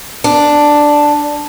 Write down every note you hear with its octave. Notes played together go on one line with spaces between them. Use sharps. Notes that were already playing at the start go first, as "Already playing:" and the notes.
D4